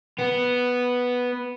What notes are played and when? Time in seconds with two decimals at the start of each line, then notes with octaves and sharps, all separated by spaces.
0.18 B3